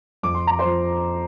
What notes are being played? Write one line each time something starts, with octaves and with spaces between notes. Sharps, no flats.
F2 D6
C6
A#5
C5 C6
F3